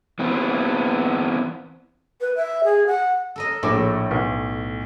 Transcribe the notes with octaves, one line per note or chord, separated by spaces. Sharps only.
E3 B3 C4
B4
E5
G#4
F#5
A4 A#4 D#5
A#1 A2 D6
B1